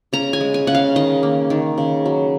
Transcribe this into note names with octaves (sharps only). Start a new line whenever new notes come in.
C#3 A#5
G#5
G#3
G#5
C#3 F#5
F5
D#3 D#5
A#3
D#3
C#3
F#3